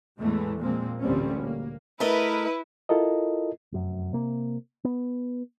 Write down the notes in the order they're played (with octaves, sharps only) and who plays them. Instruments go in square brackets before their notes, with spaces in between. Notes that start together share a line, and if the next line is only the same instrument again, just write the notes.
[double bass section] E2 A2 E3 G#3 A3
A#2 F3 G#3 A#3 C4
A1 D2 A#2 G3 C4 C#4
A#3
[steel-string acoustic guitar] A3 A#4 D#5 [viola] E4 [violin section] B4
[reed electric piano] E4 F4 A4 A#4 D#5
[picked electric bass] F1 F#2
C3 A#3
B3